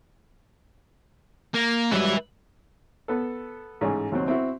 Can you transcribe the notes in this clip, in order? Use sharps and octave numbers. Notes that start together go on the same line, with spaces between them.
A#3
G#2 F#3 G3 B4 E5
B3 A4
A1 G#2
D#2 F#3 C4
C4 E4 F#4